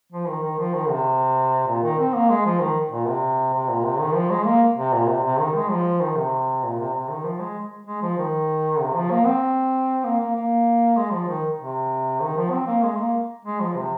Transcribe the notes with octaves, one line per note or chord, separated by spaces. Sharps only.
F3
D#3
D#3
F3
D#3
C3
A#2
D#3
C4
A#3
G#3
F3
D#3
A#2
C3
C3
A#2
C3
D#3
F3
G#3
A#3
C3
A#2
C3
C3
D#3
G#3
F3
D#3
C3
A#2
C3
C3
D#3
F3
G#3
G#3
F3
D#3
C3
F3
A#3
C4
A#3
A#3
A#3
G#3
F3
D#3
C3
D#3
F3
C4
A#3
G#3
A#3
G#3
F3
C3